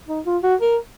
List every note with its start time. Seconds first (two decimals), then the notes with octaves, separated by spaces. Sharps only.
0.09 D#4
0.26 F4
0.43 F#4
0.61 A#4